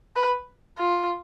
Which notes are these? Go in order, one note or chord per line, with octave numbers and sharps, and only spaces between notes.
B4
F4